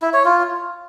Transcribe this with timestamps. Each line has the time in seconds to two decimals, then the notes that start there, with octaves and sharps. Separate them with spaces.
0.02 E4
0.14 C#5
0.25 F4